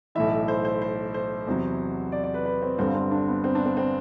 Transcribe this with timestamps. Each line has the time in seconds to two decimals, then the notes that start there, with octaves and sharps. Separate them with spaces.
0.15 B1 A2 E3 E5
0.48 C5
0.65 C5
0.82 C5
1.14 C5
1.47 E2 C3 F#3
2.12 D5
2.24 D5
2.34 B4
2.45 B4
2.62 C4
2.78 G1 G2 D3 C4
2.95 C4
3.11 D4
3.28 B3
3.44 C4
3.55 D4
3.66 C4
3.77 C4